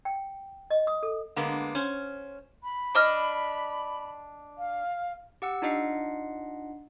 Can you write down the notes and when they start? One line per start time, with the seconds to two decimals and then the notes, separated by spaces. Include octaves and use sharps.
0.05 G5
0.70 D#5
0.87 D#6
1.03 A4
1.36 D3 G#3 A#3 B3
1.75 C#4 C5
2.63 B5
2.95 D4 D#5 F6
4.58 F5
5.42 G4 F#5 E6
5.62 D4 D#4 F4 D#5 F#5 C7